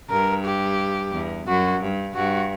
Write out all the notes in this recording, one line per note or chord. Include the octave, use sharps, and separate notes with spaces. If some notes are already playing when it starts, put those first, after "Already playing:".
G2 A#4
G4
E2
F#2 F#4
G2
G2 F#4